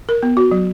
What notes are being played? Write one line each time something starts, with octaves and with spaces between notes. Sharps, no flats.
A#4
B3
F#4
F#3